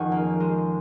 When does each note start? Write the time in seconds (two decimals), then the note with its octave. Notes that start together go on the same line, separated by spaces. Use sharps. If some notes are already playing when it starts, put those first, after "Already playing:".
Already playing: F2 D#3 C#4 G#4 A#4 F#5 G#5
0.12 A#3
0.40 G#3